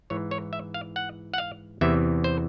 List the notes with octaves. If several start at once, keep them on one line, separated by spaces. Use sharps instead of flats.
G#2 E3 C#5
C#5
E5
F5
F#5
F#5
F5
E2 C3 E3 E5
C5